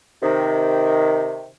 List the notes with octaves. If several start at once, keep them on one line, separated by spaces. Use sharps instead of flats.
C3 D#3